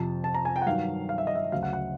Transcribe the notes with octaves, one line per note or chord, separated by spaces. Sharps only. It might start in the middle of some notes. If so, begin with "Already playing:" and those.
Already playing: F2 C3 F3 A5
A5
A#5
G#5
G5
F#5
G2 D#3 F#3 F5
F5
E5
D#5
E5
D2 C#3 F#3 F5
F#5
F#5